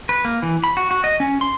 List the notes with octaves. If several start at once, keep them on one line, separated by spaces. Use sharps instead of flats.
B4
A#3
E3
B5
F#4
F#4
D#5
C#4
C6